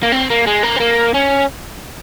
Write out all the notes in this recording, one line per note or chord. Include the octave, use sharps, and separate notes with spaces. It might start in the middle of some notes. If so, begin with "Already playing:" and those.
A#3
C4
A#3
G#3
A#3
C4
A#3
C#4